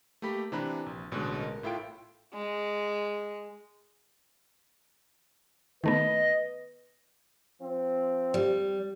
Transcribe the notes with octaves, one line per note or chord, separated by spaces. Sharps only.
A3 A#3 G4 B5 B6
C3 E3 D4 A#5 B5 F#6
A#1
A1 B2 D3 G#3 C6 F#6
A#4
A2 E4 F4 A4 G5 D7
G#3
D#3 A3 B3 B4 D#5
F3 C4
G3